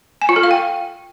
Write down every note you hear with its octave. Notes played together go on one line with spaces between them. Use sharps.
G#5
F4
A4
F5
G5